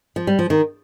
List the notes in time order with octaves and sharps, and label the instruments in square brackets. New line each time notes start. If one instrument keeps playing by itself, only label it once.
[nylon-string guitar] F3
G3
F3
D#3